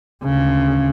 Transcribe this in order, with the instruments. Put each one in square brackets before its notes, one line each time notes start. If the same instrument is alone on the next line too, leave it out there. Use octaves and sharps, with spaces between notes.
[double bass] D2 C#3